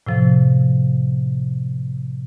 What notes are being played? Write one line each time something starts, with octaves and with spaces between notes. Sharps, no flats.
A2 C3 F3